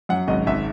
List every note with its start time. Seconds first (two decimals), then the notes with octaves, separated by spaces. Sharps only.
0.09 F#2 F#5
0.28 G#1 D#5
0.47 G#1 E5